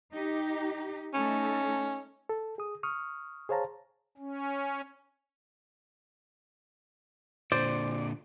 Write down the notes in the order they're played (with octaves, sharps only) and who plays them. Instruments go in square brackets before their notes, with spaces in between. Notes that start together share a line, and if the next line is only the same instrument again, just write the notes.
[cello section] D#4 G4
[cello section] A3 D#4 A4 [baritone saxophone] C#4
[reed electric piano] A4
G#4 D#6
C#6 D#6 F6
G#4 C5 C#5 F5 A5 A#5
[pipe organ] C#4
[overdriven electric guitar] A#2 D3 [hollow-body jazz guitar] C5 [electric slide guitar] D5